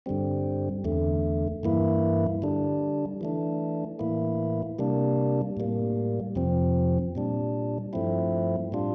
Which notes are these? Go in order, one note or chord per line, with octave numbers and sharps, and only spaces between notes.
G2 D3 G3 C4
E2 D3 A3
G2 E3 A#3 E4
D3 G3 D4
E3 A3 D4
A2 E3 A#3 E4
C3 G3 A#3 D4
A2 G3 A#3
F2 C3 F3 C4
A#2 G3 D4
G2 F3 A3 C4 E4
A2 G3 D4 F4